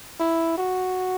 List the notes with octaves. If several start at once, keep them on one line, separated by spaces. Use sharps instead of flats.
E4
F#4